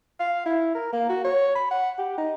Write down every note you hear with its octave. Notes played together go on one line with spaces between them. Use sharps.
F5
E4
A#4
A#3
F#4
C#5
B5
F#5
G4
D#4